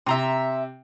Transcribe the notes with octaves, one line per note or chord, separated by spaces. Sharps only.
C3 E5 A#5 C6